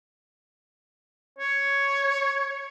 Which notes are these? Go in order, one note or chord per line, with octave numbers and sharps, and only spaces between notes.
C#5